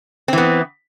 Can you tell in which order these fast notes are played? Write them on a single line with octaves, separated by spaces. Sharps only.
C4 E3 B3